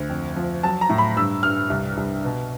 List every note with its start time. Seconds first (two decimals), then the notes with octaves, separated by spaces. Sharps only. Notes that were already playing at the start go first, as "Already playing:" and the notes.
Already playing: D2
0.09 F2
0.36 F3
0.63 F#3 A5
0.81 A#5
0.89 A2
0.98 B5
1.16 G2 E6
1.43 G2 F6
1.70 C2
1.97 C2
2.24 B2